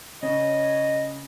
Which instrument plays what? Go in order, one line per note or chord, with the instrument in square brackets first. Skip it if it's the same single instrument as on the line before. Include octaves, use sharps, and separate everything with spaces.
[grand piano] C#3 [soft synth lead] C#5 [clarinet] D#5